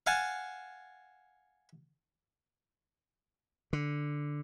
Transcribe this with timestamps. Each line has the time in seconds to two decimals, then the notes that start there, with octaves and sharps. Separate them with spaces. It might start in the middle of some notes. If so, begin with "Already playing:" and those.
0.07 F5 F#5 G#5 A5
3.73 D3